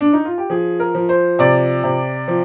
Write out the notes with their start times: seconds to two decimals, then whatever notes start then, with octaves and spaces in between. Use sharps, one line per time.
0.01 D4
0.13 D#4
0.25 F4
0.38 G4
0.50 F3 G#4
0.80 A#4
0.95 F3
1.09 C5
1.39 C3 D5
1.84 C3
2.28 F3